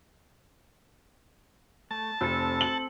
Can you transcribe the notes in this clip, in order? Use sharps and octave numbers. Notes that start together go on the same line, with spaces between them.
A3 A5
F1 C4 A4
F#7